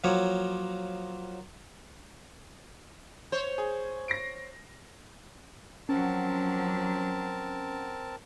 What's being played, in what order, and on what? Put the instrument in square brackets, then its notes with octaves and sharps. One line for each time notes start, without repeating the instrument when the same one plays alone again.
[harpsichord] F3 F#3 A#3 C#5
[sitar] C5 C#5
[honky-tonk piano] G#4
A#6 C7 D7
[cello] F3 F#3 [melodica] C4 A#4 A5 [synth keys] C#4 F#5